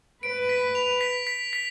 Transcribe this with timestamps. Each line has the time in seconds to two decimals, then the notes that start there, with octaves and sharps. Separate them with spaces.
0.23 B4 D7
0.49 B6
0.75 F7
1.01 B6
1.27 B6
1.53 B6